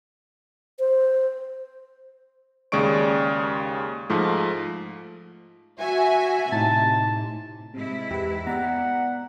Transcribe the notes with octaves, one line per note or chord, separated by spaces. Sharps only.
C5
D#2 C#3 G#3 D5 C#6 D7
G#2 F3 A3
F#4 E5 G#5
A2 C3 D#4 A5
G#2 C3 E4
E2 G4 B4
B3 D5 F#5 A#5